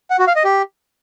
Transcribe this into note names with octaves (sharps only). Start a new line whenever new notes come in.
F#5
F#4
F5
D#5
G4